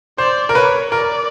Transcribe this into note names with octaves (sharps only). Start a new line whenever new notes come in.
C5 D5
A#4
B4 C#5
A#4 D5